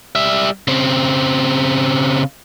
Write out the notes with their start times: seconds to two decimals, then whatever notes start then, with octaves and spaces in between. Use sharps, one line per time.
0.15 G3 E5
0.68 C#3 C4